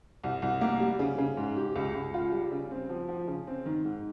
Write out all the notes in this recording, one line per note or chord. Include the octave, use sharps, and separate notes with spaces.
C2
C2
A#3
G3
C#3
C#3
G#2
G4
C#2
C#2
F4
G3
C#3
C4
F3
F3
C#3
C4
D#3
G#2